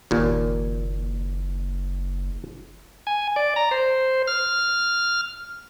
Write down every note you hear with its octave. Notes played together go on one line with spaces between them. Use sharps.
F#1 D#2 A#2
G#5
D5
A#5
C5
F6